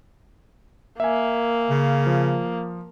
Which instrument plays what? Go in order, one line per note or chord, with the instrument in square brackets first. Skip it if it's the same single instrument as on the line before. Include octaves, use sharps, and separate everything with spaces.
[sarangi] A#3 [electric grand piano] E5 G#5
[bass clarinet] C#3
[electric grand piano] F3